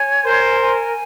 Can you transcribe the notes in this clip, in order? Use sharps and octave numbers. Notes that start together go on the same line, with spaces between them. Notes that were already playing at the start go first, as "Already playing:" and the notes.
Already playing: C#5 G#5
A#4 C5
G#5